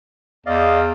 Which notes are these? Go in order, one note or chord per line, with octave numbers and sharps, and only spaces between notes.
E2 D5 D#5 F5